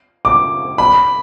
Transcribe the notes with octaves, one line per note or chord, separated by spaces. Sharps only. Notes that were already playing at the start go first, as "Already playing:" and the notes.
D6
B5